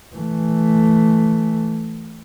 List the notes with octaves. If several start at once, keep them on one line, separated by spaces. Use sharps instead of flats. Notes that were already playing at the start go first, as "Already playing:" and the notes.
E3 A3